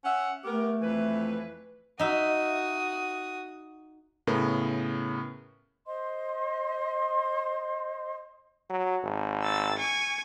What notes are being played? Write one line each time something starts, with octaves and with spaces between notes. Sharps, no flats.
C#4 E5 F#5
A3 B3 G4 A#4
F2 E3 B4
D#4 F#4 E5 D#6
A2 C#3 B3 A#4
C5 D#5 C6
F#3
G#1
E6 A6
G#5 C#6